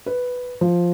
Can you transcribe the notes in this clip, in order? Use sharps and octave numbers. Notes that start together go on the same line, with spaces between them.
B4
F3